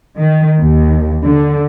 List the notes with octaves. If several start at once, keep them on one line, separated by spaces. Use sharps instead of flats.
D#3
D#2
D3